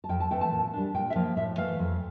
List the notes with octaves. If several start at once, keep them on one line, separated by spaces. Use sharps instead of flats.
A5
F2 G5
A5
E3 A3 C4 G5
A5
A#2
G3 D4
A#2 G5
E5
F3 A#3 F5
A2 E5
E3 A3 F5
F2